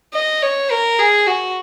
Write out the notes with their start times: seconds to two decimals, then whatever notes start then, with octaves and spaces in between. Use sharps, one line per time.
0.13 D#5
0.42 C#5
0.70 A#4
0.99 G#4
1.27 F#4